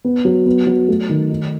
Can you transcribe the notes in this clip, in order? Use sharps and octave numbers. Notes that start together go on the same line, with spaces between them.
B3
F#3
B3
F#3
A3
D#3
D#4